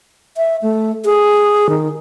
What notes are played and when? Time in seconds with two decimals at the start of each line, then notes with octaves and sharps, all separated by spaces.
0.37 E5
0.62 A3
1.05 G#4
1.69 D#3